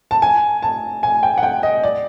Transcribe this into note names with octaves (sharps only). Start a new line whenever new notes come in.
A5
G#5
A5
G#5
G5
F#5
G5
D#5
D5